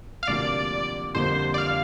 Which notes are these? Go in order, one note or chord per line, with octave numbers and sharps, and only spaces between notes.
F5
D2 C3 F3 A#3 D4 D5
F2 D3 G3 A#3 C5
D5
F5